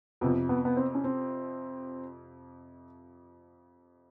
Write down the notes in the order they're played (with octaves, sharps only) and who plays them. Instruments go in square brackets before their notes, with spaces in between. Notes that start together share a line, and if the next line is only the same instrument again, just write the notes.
[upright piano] F2 C3 F3 [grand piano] B3
[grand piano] B3
B3
C4
C#4
C4